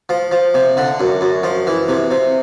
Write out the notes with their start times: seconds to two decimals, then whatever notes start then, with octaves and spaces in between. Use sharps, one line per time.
0.09 F3
0.32 F3
0.54 C3
0.77 D3
1.00 F#2
1.21 F#2
1.43 F3
1.67 E3
1.88 C3
2.11 C3